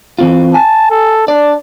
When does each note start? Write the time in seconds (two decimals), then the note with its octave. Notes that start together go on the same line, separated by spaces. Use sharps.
0.19 E3 C4 F4
0.54 G#5 A5
0.91 A4
1.28 D4 D5